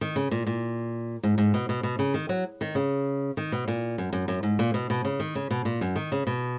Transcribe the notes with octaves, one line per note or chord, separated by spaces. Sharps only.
D#3
C#3
A#2
A#2
G#2
G#2
B2
B2
B2
C#3
D#3
F#3
D#3
C#3
D#3
B2
A#2
F#2
F#2
F#2
G#2
A#2
B2
B2
C#3
D#3
C#3
B2
A#2
F#2
D#3
C#3
B2